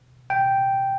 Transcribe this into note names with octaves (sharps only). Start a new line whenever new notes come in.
G5